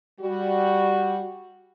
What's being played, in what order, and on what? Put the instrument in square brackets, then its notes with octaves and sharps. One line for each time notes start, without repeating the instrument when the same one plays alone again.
[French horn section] G3 F#4